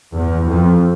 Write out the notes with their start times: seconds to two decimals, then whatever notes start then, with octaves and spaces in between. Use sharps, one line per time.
0.14 E2
0.47 F2